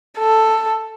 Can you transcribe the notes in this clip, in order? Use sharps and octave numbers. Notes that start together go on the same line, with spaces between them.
A4